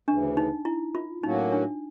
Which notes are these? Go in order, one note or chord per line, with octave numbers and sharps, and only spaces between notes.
D2 C#3 E3 D4
D#4
E4
F4
A2 F#3 A#3 C#4 D#4 F#4
D4